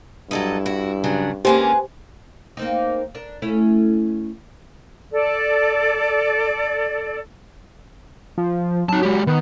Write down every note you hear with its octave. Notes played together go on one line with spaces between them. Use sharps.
G2 F#3 E4 A4 D#5
E4 F#4
C#3 F#3 D4
D3 G#3 A#3 C#4 G4 G#4 B4 C5
A#3 C4 D#4
D4 A#4
A3 C#4 E4
A4 D5
F3
F#3 D#4 A5
G#3 G4
D#3 B3